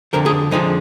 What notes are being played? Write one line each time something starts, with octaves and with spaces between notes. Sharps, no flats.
F2 D3 F3 A#4
G#4
F2 D3 F3 G#3 D#4